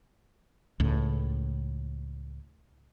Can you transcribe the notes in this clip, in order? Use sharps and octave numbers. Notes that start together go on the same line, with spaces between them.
C#2 A2